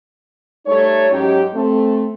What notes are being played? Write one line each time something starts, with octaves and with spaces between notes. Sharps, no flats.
G3 A3 D#4 C#5
G#2 F#3 C#4 D#4 G4
A3 C4